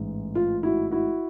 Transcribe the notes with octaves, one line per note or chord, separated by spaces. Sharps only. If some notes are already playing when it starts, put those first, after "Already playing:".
Already playing: A1 G#2 E3
F4
E4 F#4
E4 F#4